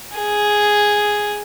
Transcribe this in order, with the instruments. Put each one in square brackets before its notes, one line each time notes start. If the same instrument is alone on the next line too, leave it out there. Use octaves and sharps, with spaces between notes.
[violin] G#4